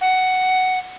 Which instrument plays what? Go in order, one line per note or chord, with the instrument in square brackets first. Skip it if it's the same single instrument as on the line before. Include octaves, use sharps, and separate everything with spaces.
[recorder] F#5